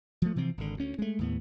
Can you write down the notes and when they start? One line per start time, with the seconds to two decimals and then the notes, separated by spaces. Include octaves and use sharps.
0.22 F3 A3
0.36 C3 E3 F3 C4
0.58 G#1 D3
0.77 D2 C#4
0.99 G#3 A3
1.19 D#2 A2 B3